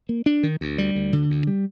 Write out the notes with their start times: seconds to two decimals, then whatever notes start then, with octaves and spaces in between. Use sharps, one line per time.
0.09 A#3
0.26 D4
0.43 D#3
0.61 D2
0.78 G3
0.95 D2
1.13 D3
1.30 D2
1.47 G3